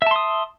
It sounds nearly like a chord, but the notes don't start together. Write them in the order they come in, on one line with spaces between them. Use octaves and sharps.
E5 A5 C6 D#6